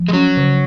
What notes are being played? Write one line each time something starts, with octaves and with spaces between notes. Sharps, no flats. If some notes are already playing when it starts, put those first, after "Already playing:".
Already playing: F3
G#3
F#3 C#4
C#3